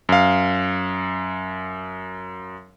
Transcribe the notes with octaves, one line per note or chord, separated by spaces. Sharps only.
F#2 F5